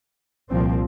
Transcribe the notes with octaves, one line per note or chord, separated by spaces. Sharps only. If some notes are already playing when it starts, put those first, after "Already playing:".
C2 A#2 F3 C4